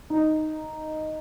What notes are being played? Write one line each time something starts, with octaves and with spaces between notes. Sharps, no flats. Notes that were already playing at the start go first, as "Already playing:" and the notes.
D#4